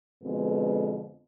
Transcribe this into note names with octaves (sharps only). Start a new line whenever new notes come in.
F2 B2 D3 G#3 B3